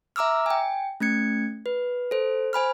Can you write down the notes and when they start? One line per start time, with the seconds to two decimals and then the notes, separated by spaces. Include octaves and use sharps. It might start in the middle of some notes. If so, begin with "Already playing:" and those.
0.16 E5 A#5 D6 E6 F6
0.46 G5 G#5
1.00 A3 C#4 G#6 C#7
1.66 B4
2.11 A4 C5
2.53 C5 G#5 B5 F6